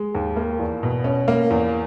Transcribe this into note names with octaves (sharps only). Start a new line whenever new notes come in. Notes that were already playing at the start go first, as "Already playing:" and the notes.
Already playing: G#3
D#2
A#3
E2
B2
C#4
A#3
E2